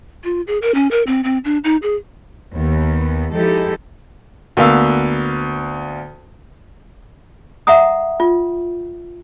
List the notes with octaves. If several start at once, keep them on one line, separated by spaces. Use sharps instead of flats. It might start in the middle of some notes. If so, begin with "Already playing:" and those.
F4
G#4
A#4
C#4
A#4
C4
C4
D4
D#4
G#4
D#2 B3
F3 G#3 D#4 E4 G4 A4
D2 A#3 B3 F5 C#6 E6
E5 F#5 A#5 D#6
F4